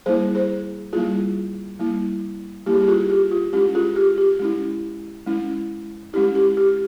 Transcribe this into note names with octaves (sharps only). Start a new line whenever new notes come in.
G3 A#3 E4 G#4 C5
G#4 C5
G3 A#3 E4 F4 G#4
G3 A#3 E4
G3 A#3 E4 G4
G#4
G4
F4 G#4
G4
F4
G#3 C#4 E4 G4
F4 G#4
G4
G4
G#3 C#4 E4
G#3 C#4 E4
G#3 C#4 E4 G4
G4
G4